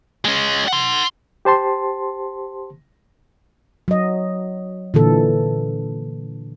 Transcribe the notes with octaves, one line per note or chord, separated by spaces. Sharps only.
G#3 C#4
F#5 C6
G4 C5 A5 C6
F#3 D#5
A#2 D3 E3 A4